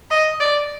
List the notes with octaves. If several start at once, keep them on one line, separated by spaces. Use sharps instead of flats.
D#5
D5